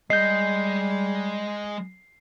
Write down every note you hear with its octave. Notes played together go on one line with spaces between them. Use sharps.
G3 G#3 D#5 G6 C7